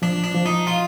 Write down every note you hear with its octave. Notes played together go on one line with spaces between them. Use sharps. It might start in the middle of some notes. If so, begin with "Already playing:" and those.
F3 D4
D4
F3
D#4
F4